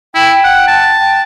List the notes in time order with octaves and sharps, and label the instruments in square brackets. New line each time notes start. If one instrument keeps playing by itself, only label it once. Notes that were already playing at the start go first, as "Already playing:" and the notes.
[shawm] E4 [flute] G5
[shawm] F#5
A5
[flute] G5